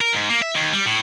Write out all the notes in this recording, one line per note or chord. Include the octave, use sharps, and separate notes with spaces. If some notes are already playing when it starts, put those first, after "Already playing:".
A#4
G#2
A#3
E5
D#2
G3
A2